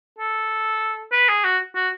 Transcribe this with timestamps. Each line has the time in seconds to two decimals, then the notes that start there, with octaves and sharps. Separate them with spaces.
0.19 A4
1.12 B4
1.29 G#4
1.44 F#4
1.75 F#4